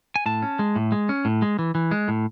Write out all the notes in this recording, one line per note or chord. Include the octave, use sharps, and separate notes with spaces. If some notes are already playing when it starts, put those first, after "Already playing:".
G#5
A2 A5
C#4
G#3
A2
G#3
C#4
A2
G#3
E3
E3
G#3
A2